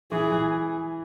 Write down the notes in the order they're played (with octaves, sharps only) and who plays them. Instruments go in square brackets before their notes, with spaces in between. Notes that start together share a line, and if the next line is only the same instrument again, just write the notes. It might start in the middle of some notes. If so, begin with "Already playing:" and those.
[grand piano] E3 [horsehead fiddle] G#4
[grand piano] E3